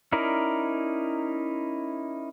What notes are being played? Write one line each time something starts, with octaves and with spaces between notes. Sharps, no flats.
C#4 D#4 E4 A#4 D5